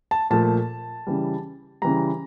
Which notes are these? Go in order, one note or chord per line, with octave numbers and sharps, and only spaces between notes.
A5
A#2 F3 A3 A5
C#3 E3 G3
C#3 E3 G3 A#5